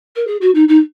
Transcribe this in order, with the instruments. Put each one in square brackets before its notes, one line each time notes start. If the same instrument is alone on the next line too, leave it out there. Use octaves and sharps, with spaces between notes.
[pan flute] A#4
G#4
F#4
D#4
D#4